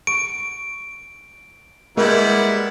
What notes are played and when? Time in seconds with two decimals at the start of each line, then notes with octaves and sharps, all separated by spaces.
0.07 C#6 D7
1.97 G3 G#3 A#3 B3 E4 A#4